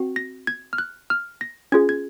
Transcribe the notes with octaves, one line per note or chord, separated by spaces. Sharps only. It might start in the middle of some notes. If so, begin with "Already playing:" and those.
Already playing: C4 F#4
A#6
G#6
F6
F#6
F6
A#6
C#4 F4 G#4 G#6
G#6